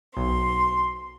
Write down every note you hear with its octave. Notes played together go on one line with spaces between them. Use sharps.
B1 C6